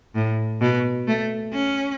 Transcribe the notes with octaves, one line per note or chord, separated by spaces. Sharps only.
A2
B2
A3
C#4